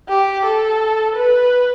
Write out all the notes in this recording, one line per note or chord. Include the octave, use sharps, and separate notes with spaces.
G4
A4
B4